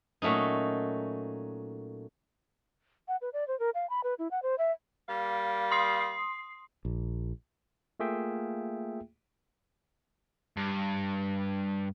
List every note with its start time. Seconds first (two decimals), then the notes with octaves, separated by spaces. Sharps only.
0.22 A#2 F#3 A3 C#4 D#4
3.08 F#5
3.22 B4
3.33 D5
3.48 C5
3.60 A#4
3.75 F5
3.90 B5
4.04 B4
4.19 E4
4.31 F#5
4.42 C5
4.58 E5
5.08 G3 A#3 F5
5.71 C6 D#6 C7
6.85 A#1
8.00 A3 A#3 F4 G#4 E5 G5
10.57 G2